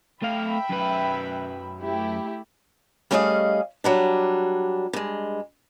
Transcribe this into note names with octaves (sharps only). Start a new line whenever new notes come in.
A3 E5 F5 G5 B5
F#2 B4
A3 E4 G4
G3 A3 C#4 G#4 D#5 F5
F#3 G3 D4
G2 G#3